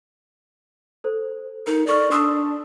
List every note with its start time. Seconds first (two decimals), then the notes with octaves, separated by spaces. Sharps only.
1.04 A4 C5
1.67 D#4 A#4
1.87 A4 D5 C#6 F6
2.11 D4 C6 D#6 E6